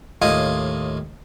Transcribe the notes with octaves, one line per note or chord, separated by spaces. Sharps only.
D#2 A2 F4 D#5 F5 G#5